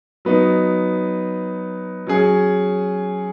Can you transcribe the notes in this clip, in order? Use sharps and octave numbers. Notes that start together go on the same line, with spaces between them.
F#3 B3 D#4
F#3 C#4 G#4